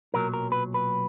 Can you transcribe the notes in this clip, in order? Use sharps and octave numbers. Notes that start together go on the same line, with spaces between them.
B1 A#2 F#3 A#4
A#4
B4
B4